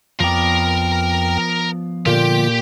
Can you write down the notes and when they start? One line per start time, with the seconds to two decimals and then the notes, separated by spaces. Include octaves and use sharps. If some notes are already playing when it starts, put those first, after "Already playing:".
0.20 F2 F3 B3 A#4 D5 G5
2.06 A#2 D3 F4 G4 G5